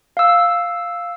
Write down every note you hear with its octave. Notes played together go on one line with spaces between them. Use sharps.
F5 E6